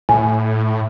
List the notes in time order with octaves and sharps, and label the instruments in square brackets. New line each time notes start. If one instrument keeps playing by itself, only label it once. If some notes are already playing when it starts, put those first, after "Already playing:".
[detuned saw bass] A2 [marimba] G#5